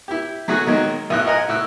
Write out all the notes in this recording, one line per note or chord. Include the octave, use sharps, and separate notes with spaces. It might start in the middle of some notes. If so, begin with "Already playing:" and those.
E4 G4
F#3 A3 F#4 G#4
D#3 F#3 G#3 A#3
B1 A2 F#6
A#4 D#5 F#5 G#5 A#5
A2 E6 F#6